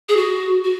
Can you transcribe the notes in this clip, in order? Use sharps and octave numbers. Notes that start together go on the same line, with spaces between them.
G#4
F#4
F#4